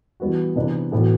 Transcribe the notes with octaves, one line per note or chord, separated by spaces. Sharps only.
E3 G3 B3 F#4
C3 E3 B3 D4
A2 E3 B3 F#4